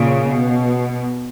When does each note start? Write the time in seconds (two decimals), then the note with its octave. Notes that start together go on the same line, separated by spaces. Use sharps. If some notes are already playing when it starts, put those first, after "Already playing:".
Already playing: A#2 C#3
0.30 B2